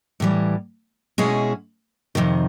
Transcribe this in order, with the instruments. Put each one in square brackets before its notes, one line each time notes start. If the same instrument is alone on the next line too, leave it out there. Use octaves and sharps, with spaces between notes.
[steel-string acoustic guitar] A2 E3 G3
B2 G#3 C#4 E4 G#4
F2 C3 D#3